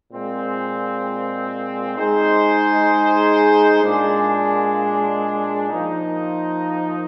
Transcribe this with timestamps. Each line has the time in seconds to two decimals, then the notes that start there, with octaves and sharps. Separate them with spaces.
0.10 A#2 G#3 C4
1.97 G#3 D#4 G#4 C5
3.83 A#2 G#3 D4
5.69 F3 A#3 D#4